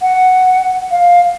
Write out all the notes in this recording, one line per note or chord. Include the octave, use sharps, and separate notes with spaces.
F#5
F5